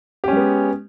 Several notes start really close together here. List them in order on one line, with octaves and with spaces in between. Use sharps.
G4 C#4 G#3 B3